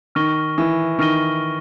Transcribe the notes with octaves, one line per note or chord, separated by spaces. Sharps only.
D#3 C#6 F6 A#6 D#7 G7
E3
D#3 C#6 F6 A#6 D#7 G7